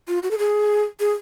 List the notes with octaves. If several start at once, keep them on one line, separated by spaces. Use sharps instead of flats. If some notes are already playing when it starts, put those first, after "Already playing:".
F4
F#4
A4
G#4
G#4